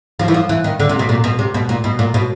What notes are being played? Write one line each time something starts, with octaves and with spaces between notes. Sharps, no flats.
F3
E3
F3
E3
D#3
D3
C3
B2
A#2
B2
C3
B2
A#2
B2
A#2
B2